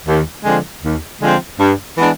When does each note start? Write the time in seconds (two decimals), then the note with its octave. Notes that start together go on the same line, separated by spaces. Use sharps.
0.07 D#2
0.44 D3 F3 G#3 C4
0.83 D#2
1.21 D3 F3 G#3 C4
1.60 G2
1.97 E3 G#3 B3 D4